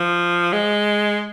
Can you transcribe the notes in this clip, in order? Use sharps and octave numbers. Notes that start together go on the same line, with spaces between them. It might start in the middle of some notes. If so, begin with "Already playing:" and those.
Already playing: F3
G#3